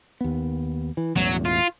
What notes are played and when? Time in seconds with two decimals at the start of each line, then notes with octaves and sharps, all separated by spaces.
0.21 D#2 B3
0.97 E3
1.16 E1 A1 E2 F#3
1.45 F4